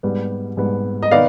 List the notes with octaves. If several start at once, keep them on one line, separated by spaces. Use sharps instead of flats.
G#2 G3 B3
G#2 G3 B3
D#5
D#3 B3 D#4 D5 F5